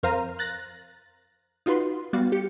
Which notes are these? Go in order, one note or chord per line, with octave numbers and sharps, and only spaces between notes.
F2 A#4 C5 F5 A#5 D#7
F#6 A6 A#6
D#4 F4 F#4 B4 C6
G3 B3 F#4 F5 A6
G4 C#7